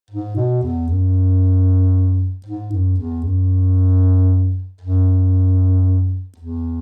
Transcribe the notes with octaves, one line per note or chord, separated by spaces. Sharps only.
G#2
B2
E2
F#2
G#2
F#2
E2
F#2
F#2
E2